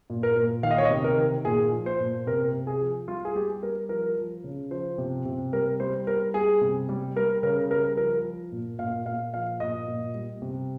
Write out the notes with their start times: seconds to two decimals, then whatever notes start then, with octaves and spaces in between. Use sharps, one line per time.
0.10 A#2
0.23 A#4
0.36 A#2
0.63 D#3 F5
0.71 D#5
0.78 C#5
0.85 D#5
0.90 C3
1.04 A#4
1.17 D#3
1.45 A#2 G#4
1.72 F3
1.86 C5
2.00 A#2
2.27 C3 A#4
2.53 C3
2.67 G#4
2.81 F3
3.08 G3 F4
3.25 G#4
3.35 G3 G4
3.63 G3 A#4
3.89 F3 A#4
4.18 F3
4.44 C#3
4.71 F3 C5
4.98 C3
5.25 C3
5.53 G3 A#4
5.80 G3 C5
6.07 G3 A#4
6.34 G3 G#4
6.61 C3
6.89 G3
7.16 G3 A#4
7.43 C#3 A#4
7.70 G3 A#4
7.97 F3 A#4
8.24 F3
8.52 A#2
8.79 A#2 F5
9.06 A#2 F5
9.34 F3 F5
9.60 A#2 D#5
9.88 A#2
10.15 G3
10.42 C3